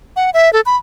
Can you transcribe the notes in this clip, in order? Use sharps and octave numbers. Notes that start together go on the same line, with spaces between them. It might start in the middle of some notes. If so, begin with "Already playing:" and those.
F#5
E5
A4
B5